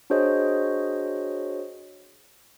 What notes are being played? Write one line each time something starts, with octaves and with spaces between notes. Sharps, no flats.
D4 F#4 G#4 C5 C#5 D#5